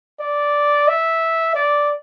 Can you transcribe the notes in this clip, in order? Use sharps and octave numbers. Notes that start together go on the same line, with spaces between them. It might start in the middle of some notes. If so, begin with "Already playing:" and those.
D5
E5
D5